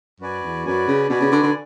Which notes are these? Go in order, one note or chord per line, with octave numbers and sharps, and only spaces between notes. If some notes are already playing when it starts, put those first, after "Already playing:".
F#2 F#4 B4 D5 G#5
E2
F#2 F#4 B4 D5 G#5
C#3
B2 F#4 B4 D5 G#5
C#3
D3
D3